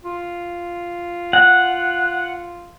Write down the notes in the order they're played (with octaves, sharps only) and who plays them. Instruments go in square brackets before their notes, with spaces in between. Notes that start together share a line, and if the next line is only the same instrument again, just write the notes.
[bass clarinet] F4
[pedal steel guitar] F#5